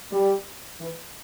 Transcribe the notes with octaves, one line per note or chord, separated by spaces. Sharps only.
G3
E3